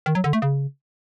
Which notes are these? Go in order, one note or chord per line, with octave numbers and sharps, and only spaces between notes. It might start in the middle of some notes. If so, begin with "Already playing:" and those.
D#3
F#3
D3
A3
C#3